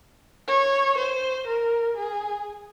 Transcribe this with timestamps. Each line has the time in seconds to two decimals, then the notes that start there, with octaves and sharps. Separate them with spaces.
0.48 C#5
0.97 C5
1.47 A#4
1.97 G#4